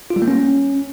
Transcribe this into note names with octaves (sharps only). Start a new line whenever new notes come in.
F4
G3
A#3
C#4